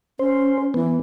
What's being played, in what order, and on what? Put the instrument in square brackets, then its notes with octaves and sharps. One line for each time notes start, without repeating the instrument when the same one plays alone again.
[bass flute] C#4 [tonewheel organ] C5
[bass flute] E3 [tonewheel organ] B3